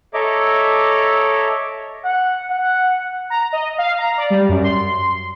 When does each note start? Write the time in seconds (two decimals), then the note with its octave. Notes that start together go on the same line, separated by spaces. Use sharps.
0.14 A4 C#5 D#5 E5 A#5 D6
2.04 F#5
2.50 F#5
3.30 A#5
3.53 D#5
3.78 F5
3.98 A#5
4.17 D5
4.30 G3
4.49 F#2
4.63 C6